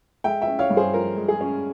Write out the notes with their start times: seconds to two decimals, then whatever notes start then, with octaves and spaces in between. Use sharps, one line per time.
0.24 G#3 E5 G5
0.42 E5 G5
0.47 C#4
0.59 C#5 F5
0.70 G2
0.77 G#4 C5
0.94 F3 A#4
1.17 G#3
1.28 G#4
1.41 C#4